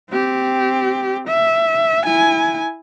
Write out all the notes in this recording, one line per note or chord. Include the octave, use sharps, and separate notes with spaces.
C4 G4
E5
E4 G#5